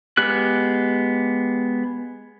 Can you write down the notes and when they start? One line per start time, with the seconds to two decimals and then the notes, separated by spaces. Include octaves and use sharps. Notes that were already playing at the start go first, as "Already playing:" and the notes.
0.17 G#3 B3 G4 F#6